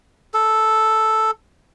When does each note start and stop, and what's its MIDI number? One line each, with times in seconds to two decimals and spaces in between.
0.34 1.31 69